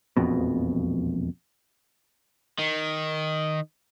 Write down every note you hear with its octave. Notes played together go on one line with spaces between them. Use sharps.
E1 A#1 F2 B2
D#3